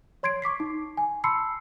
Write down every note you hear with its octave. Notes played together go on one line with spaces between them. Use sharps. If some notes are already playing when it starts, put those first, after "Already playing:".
C#5 C6 G#6 C7 D7
C#6 D6 B6 C7
D#4
G#5
A5 B5 C6 E6 C7 C#7